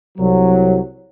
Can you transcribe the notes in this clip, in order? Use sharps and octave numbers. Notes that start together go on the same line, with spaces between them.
C2 F#3